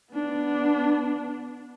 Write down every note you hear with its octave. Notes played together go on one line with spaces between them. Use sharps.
B3 D4